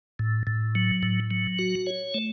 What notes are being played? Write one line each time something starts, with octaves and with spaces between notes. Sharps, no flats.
A2
A2
F#3
A2
F#3
F#4
C#5
A3